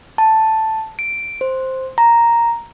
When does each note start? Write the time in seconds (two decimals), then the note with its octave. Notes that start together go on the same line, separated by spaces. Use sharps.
0.18 A5
0.99 D7
1.41 C5
1.98 A#5